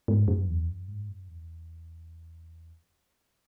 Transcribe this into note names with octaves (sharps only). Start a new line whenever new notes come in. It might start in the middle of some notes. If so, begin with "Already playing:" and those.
G#2
F#2
E2
F#2
G#2
F#2
E2